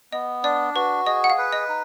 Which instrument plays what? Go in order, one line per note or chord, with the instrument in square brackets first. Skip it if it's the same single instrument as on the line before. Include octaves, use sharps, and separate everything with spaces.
[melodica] B3 [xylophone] D#5
[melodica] D4 [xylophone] D5
[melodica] F#4 [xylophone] B4
[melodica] G#4 [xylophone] D#5
[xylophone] F#5
F5
[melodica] B4
[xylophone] D#5
[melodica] D#4